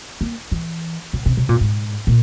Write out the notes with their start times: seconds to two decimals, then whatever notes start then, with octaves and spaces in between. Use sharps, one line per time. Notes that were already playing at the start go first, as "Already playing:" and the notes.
0.21 A#3
0.51 E3
1.13 C#3
1.26 C3
1.37 C3
1.49 A#2
1.61 G#2
2.07 A#2